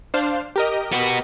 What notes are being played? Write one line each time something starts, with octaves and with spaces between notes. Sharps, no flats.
D4 C5 F5
G4 A#4 D#5
B3 F#4